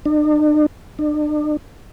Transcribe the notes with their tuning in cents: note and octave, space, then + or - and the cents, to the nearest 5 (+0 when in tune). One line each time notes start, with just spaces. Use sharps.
D4 +45
D4 +40